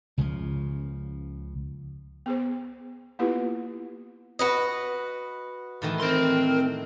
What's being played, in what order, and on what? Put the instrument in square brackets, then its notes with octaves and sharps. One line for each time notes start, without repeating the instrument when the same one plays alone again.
[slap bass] C#2 C#3 E3 F3
[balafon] B3 G#4 C5
A#3 B3 E4 F4 G4 B4
[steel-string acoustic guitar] F#4 B4 D#5
[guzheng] A2 D#3 E3
[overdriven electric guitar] C4 C6 [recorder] A#4